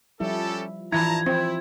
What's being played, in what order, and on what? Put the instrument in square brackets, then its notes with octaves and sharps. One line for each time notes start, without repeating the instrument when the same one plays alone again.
[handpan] F3 G3 E4 [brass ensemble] C#4 G4 A4
[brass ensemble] G2 A5 A#5 [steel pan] E3 E4 [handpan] F3 [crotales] G#6
[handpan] F3 [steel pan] C4 [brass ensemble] E4